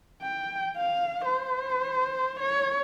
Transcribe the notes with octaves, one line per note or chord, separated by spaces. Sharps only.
G5
F5
C5
C#5